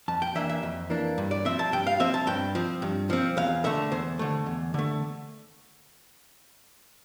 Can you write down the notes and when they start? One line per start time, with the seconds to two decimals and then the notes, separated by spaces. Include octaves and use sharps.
0.08 F2 A5
0.22 G5
0.35 E3 A#3 D4 E5
0.49 E5
0.63 F2
0.90 E3 A#3 D4
1.18 G2
1.31 D5
1.45 F3 C4 E5
1.59 A5
1.72 G2 G5
1.87 F5
2.00 F3 C4 E5
2.14 A5
2.27 G2 G5
2.55 F3 C4
2.82 G2
3.10 F3 C4
3.37 E2 F5
3.64 D3 A3 E5
3.92 E2 C5
4.19 D3 A3
4.46 E2
4.74 D3 A3